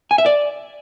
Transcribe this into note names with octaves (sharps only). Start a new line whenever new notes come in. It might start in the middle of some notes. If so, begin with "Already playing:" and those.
G#5
E5
D5